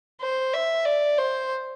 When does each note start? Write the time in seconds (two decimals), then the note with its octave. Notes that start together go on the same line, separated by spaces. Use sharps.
0.21 C5
0.54 E5
0.85 D5
1.18 C5